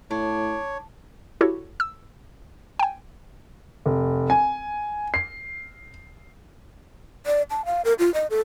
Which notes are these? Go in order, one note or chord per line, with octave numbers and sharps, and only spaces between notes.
A2 D4 C#5
E4 F#4 G4 A4 C#5
E6
G5 G#5
F1
G#5
C7
D5
A5
F5
A#4
F4
D#5
A4